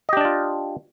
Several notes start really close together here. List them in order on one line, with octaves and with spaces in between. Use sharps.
D#5 G4 D4 D5 F4